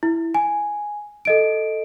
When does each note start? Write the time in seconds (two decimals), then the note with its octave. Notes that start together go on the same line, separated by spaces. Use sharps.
0.03 E4
0.35 G#5
1.25 A4 D#5 D7